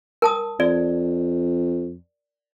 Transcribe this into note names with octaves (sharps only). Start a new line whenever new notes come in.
A#4 A5 D#6
F2 D5